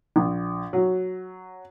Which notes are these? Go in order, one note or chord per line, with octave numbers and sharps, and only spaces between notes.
A#1
F#3